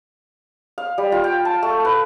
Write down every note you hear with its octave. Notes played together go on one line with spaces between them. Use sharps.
F5
G3
F4
G5
A5
A3
B4